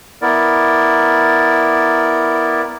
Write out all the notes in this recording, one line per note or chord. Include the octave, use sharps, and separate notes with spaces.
B3 E4 A#4 D5